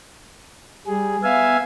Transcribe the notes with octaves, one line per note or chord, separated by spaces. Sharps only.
G3 G#4
B3 E5 F5 G#5